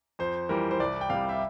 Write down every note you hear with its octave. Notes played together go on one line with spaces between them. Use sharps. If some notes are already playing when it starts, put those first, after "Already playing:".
F2 C5
E3 G3 A#4
C5
C2 D5
G5
C3 G3 F5
E5